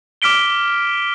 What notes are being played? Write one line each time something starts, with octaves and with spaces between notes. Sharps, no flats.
D6 F6 B6 D7 G7